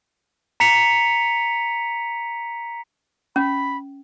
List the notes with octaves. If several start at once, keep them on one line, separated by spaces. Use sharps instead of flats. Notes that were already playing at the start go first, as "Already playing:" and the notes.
A#5 B6 C#7 F7
C#4 B5